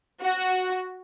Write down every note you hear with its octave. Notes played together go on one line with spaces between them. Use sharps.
F#4